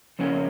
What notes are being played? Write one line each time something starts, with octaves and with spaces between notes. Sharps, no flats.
F2 C#3 A#3 C#4